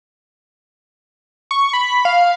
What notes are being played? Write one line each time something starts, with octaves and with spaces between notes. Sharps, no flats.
C#6
B5
F5